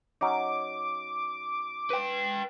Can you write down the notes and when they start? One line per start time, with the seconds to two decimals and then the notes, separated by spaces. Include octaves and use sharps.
0.21 F#3 C#4 D#4 D6
1.90 B4 G5